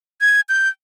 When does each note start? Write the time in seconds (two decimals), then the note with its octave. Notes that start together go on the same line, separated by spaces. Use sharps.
0.21 G#6
0.49 G6